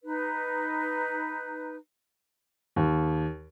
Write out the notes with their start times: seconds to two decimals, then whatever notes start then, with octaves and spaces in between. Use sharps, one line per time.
0.03 D#4 B4
2.76 D#2